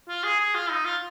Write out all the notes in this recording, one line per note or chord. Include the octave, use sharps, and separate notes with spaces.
F4
G#4
G#4
F4
D#4
F4